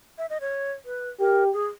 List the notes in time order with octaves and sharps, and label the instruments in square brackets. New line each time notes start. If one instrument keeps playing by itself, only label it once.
[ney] E5
D#5
C#5
B4
[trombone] G4 [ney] A#4
[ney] G#4